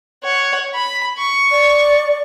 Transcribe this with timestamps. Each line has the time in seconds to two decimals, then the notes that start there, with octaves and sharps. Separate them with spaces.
0.24 C#5 F#5
0.74 B5
1.18 C#6
1.51 D5